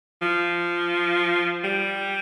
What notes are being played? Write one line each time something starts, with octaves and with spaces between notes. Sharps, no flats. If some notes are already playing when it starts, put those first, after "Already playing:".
F3
G3